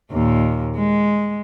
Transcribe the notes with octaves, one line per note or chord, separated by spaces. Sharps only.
D#2 A#2
G#3